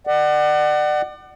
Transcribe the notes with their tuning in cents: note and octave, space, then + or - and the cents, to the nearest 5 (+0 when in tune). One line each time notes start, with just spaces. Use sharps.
D5 +35 F#5 +25